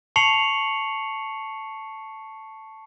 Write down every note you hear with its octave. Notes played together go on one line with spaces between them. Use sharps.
A5 C#6 C7 C#7 F7 F#7